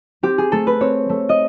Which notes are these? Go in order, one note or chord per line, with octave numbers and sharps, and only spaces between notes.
C4 G4
G#4
A3 A4
B4
C4 C#5
A3
D#5